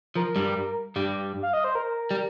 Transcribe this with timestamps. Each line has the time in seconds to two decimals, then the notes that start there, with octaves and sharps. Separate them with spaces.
0.16 F3 A#4
0.36 G2 G3
0.96 G2 G3
1.43 F5
1.53 D#5
1.64 C5
1.75 A#4
2.11 G3